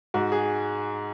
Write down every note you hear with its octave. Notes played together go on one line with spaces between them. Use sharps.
G#2 F#4
G#4